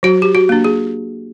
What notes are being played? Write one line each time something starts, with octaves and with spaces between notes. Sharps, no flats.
F#3 F#4
G4
F#4
A#3 D4
G#4